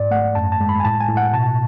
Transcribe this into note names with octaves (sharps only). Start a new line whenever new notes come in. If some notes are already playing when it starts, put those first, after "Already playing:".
Already playing: G#2 D5
A3 F#5
F#2 A5
A5
G#3
B5
G#5
A2 A5
G#5
A2
F#5
B2 A5